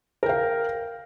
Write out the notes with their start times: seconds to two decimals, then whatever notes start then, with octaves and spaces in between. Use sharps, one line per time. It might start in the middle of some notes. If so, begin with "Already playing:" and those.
0.23 A#4
0.26 G5
0.29 F5